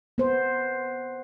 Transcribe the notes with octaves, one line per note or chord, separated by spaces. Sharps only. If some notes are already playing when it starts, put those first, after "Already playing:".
B3 C5